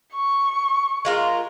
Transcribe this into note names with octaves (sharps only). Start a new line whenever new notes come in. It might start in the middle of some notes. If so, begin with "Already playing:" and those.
C#6
G#3 F4 A#4